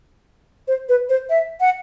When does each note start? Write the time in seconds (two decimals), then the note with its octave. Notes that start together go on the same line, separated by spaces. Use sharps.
0.68 C5
0.89 B4
1.09 C5
1.30 E5
1.60 F#5